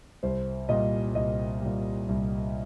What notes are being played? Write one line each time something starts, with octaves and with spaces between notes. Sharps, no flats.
C2 C5
A#2 G3 D#5
C2 D#5
A#2 G3
C2